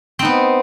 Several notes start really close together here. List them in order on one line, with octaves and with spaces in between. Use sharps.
C4 D#4 B3